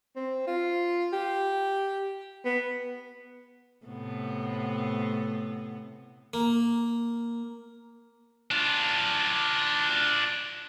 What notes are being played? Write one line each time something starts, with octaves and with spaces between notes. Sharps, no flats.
C4
F4
G4
B3
A2 C3 B3
A#3
D4 F4